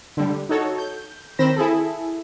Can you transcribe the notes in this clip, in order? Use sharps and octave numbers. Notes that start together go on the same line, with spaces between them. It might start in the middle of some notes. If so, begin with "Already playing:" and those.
D3 G3
D#4 F#4 A4 C#5
G6
D#3 C4 C5 B5 A#6 E7
E4 G#4 A4